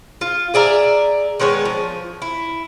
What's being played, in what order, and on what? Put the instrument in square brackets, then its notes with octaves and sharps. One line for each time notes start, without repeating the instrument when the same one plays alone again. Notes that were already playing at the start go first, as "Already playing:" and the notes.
[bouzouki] F4
G#4 D5 E5 A#5
D#3 G#3 B3 C#5
F3
E4